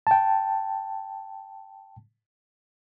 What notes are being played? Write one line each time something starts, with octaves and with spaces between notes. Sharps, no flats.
G5 A5